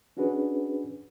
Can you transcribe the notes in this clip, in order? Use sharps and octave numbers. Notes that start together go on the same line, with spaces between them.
C#4 D4 F#4 G#4 B4